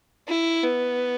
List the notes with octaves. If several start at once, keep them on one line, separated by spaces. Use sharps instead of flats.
E4
B3